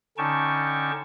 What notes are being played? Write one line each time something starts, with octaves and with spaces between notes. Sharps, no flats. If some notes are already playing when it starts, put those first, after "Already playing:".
D3 C#4 D#4 G5 A5 C#6